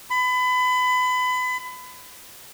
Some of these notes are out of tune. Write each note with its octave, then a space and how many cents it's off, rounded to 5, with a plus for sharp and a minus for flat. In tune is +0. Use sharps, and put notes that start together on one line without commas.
B5 +30